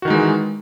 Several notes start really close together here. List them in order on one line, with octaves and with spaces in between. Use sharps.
F#4 D#3 D#4 G#3 E3